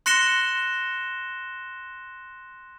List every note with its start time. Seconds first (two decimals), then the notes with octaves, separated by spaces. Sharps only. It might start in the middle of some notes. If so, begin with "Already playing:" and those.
0.06 C6 F#6 A#6 C#7 E7 G7